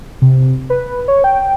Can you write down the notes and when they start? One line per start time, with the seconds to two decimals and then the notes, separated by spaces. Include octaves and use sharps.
0.22 C3
0.70 B4
1.08 C#5
1.24 G5